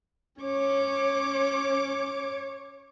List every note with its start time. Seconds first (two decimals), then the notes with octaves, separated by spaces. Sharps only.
0.41 C#4 C#5 D6